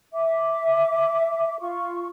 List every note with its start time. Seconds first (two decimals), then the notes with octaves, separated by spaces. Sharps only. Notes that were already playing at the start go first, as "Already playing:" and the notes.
0.13 E5 D6
1.59 F4 C#6